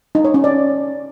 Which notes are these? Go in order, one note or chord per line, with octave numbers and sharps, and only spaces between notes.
D#4
C#5
C#4
D5